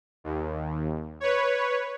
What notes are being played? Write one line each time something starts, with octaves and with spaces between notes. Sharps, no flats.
D#2
B4 C#5